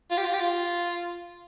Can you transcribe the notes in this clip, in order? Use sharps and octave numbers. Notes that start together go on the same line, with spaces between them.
F4
G4
F4
G4
F4